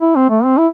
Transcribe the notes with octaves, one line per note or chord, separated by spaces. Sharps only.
E4
C4
A3
C4
E4